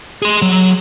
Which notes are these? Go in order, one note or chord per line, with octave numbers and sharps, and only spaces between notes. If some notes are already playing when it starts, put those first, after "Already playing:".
G#4 C6
F#3